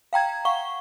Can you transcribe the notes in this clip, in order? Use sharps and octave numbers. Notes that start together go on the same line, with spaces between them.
F5 G5 A#5 G#6
F5 F#5 C#6 G7